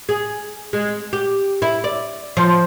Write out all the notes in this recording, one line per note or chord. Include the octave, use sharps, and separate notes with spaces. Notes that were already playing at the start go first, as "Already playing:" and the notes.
G#4
G#3
G4
E4
D5
F3